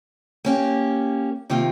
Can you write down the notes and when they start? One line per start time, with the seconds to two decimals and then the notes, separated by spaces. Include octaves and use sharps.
0.45 A#3 C#4 G4
1.50 C3 D#3 A#3 F4